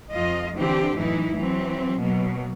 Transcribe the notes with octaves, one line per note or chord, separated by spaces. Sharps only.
F2 F4 D#5
D3 E3 C4 D4 G4
F#2 A2 E3 D#4 E4
E3 F#3 C4
B2 F#3 A#3